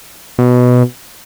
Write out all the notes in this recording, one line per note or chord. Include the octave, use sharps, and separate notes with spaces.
B2